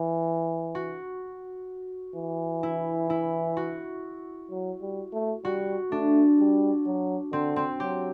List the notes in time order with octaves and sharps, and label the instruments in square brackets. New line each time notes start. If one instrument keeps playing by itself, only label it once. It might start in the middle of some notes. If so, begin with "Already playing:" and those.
Already playing: [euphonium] E3
[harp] F#4
[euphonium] E3
[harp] E4
E4
F#4
[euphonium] F#3
G3
A3
[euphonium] G3 [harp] F#4
[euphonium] A3 [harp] D4
[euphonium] G3
F#3
[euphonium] D3 [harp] C4
[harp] C4
[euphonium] F#3 [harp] G4